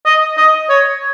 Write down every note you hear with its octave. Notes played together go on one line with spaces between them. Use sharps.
D#5
D#5
C#5